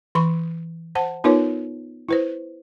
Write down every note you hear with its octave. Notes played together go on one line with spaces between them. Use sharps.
E3 B5 C#6
C5 F#5 A5
B3 D#4 F4 A#4 B4 C#5
E4 B4 C5